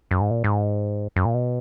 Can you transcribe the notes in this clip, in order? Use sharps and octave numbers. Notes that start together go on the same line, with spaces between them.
F#2
G#2
A#2
G#2
F#2
A#2
B2